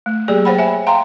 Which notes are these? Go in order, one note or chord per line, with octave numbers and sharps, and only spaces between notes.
A3
F#3 A#3 G4 G#4 D5
C5 C#5 F#5 G5 B5
E5 G#5
F5 G5 A#5 C6